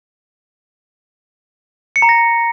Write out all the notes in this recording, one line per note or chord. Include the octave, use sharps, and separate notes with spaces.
C#7
A#5
A#6